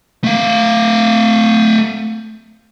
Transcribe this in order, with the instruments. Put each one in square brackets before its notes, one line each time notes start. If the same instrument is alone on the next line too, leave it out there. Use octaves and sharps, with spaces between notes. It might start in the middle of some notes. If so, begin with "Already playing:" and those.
[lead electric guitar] A3 F5